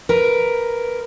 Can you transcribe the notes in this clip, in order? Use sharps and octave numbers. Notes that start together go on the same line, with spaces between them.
A#4 B4